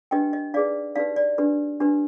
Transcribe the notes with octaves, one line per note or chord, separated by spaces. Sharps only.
D4 G4 B4 D#5 G5
D#5
D#4 G#4 B4 D5 F5
D#4 G4 B4 D5 F5
D5
D4 G4 B4
D4 G4 B4